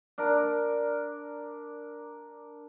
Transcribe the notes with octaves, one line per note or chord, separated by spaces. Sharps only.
D4 A#4